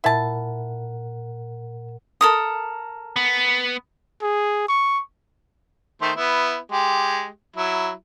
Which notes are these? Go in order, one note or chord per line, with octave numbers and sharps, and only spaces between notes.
A#2 E4 A#4 F#5 A5
A4 A#4 D#6
B3
G#4
C#6
D#3 A3 C5
B3 E4
G#3 G4
F#3 E4